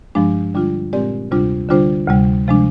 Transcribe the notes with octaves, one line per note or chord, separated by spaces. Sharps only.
G2 F3 G#3 D4
D3 G3 D4 F4
A#2 G#3 C4 G4 D5
D2 C3 G3 D4 F4
D3 G3 D4 F4 C5
D2 C3 G3
C3 F3 G#3 D4